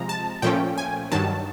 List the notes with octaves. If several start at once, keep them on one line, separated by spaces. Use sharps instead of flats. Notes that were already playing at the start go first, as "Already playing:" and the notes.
Already playing: C3 F3 G#3 A#5
A5
A#2 F3 A3 C#4 G5
G#5
G2 D#3 F#3 A5